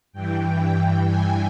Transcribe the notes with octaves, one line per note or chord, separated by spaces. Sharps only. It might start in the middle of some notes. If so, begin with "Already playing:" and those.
G2 E3 G5
G#5